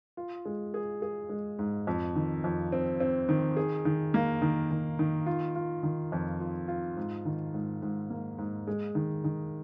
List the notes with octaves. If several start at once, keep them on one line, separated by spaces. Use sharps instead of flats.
F4
G#3
G#4
G#4
G#3
G#2
F2
D#3
F2
C4
C4
D#3
G#4
D#3
A#3
D#3
D#3
D#3
F4
F4
D#3
F2
F4
F4
G#2
D#3
G#2
G#2
A#3
G#2
G#3
D#3
D#3